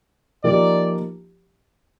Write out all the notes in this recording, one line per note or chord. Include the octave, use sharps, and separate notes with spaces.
F3 A#3 D#4 G4 D5